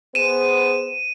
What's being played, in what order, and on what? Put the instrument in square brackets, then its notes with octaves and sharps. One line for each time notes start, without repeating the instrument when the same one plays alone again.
[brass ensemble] B3 G#4 C5 [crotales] D#7 E7